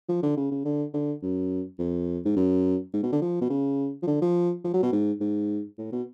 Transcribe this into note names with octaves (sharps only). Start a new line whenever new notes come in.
F3
D3
C#3
C#3
D3
D3
F#2
F2
G#2
F#2
G#2
B2
D3
F3
B2
C#3
F3
D3
F3
F3
F#3
B2
G#2
G#2
A2
B2